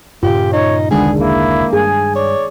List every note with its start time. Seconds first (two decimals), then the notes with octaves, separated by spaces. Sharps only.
0.23 G2 A#2 C#3 F4 G4
0.53 D#4 C#5
0.91 E1 C2 D3 D#3 G#3 B3 D4 G#4
1.20 A#3 E4
1.73 G2 G#4 G#5
2.16 C#5 D5